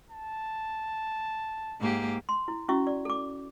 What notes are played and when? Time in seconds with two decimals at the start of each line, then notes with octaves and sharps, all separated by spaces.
0.11 A5
1.80 G#2 A#3 G4
2.29 C6
2.48 E4
2.68 C#4 E4 F#4 E5 C#6
2.87 D5
3.05 A4 D6